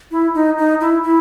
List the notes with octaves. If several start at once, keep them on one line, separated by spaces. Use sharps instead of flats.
E4
D#4
D#4
E4
E4